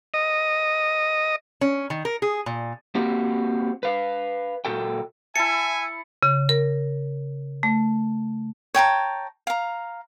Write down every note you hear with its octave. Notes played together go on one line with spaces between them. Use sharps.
D#5
C#4
D#3
A#4
G#4
A#2
A#3 C4 F#4 G4
B4 F5
A#2 F#4 A4 G5
E4 E5 G#5 A5 C#7
C#3
A#4
A3
C#5 G5 A5 A#5
F5 A#5